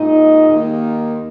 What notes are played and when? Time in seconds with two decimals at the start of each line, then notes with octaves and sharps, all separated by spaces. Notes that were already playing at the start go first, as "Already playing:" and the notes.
Already playing: A#2 G#3 D#4
0.50 D#2 D#3 A#3